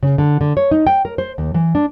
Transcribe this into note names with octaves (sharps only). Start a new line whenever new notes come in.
C#3
D3
D3
C#5
D#4
G5
A#4
C5
D#2
E3
D4